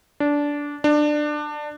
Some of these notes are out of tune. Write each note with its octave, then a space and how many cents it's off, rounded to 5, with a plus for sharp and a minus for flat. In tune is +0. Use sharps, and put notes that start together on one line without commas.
D4 -15
D4 +20